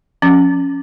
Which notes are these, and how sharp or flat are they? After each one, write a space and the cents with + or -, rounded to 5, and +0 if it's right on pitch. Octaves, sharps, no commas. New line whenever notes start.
F3 +25 C#4 +0